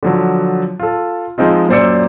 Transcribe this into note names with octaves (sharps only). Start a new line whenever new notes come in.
D3 F3 F#3
F4 A4
F3 G#3 C4 D#4 F4
F#2 A#2 C5 D5 E6 C#7